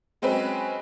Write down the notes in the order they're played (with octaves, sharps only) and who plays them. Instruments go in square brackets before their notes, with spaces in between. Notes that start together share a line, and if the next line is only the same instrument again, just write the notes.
[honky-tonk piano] F#3 G#3 C4 C#4 B4